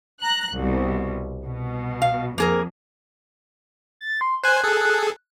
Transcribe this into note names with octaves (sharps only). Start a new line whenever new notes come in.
A#5 F#6
C2 B2
B2
F5
F2 A#3 G#4 A#4
A6
C6
C5 G#5 F#6
G#4 A4